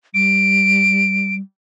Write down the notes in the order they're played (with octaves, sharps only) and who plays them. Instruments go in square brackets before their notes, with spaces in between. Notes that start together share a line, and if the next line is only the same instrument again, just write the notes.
[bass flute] G3 [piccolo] D7